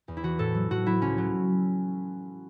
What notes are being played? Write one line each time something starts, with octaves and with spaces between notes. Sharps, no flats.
E2
E4
E3 F#4
A2 A4
F#3
A2 F#4
F#3 E4
C#2 C#4
F#3